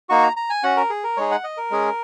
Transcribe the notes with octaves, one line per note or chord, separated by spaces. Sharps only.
A#3 D#4 F#4 C#6
A#5
A#5
G#5
C#4 F#4 F#5
A#4
G#4
A#4
G#3 D#4 G#4 C#5
F#5
D#5
A#4
G#3 C#4 G#4